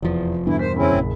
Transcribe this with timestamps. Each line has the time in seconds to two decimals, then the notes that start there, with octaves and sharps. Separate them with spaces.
0.02 F1 E2 F3
0.47 E2 G2 B2 D3 E3 E4
0.59 A#4 C5 B6
0.76 F#1 C4 C#4 E4 G#4 B5
0.96 A#1